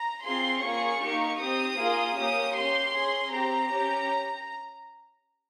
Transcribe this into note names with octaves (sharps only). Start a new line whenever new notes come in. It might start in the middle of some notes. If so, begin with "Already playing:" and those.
Already playing: A#5
C4 F4 G#4 C6
A#3 C#4 F4 G#4 C#6
A#3 D#4 G4
C4 G4 D#6
A#3 F4 G#4
A#3 C#4 G4 D#6
C#4 G4 C6
C#4 G#4
C4 G4 A#5
C#4 G4